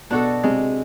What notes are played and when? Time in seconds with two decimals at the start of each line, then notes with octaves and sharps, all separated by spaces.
0.10 B2 D4 F#4 A4
0.44 C3 G#3